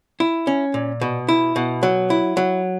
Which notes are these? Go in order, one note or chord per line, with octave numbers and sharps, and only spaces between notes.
E4
C#4
A#2
B2
E4
B2
F#3
E4
F#3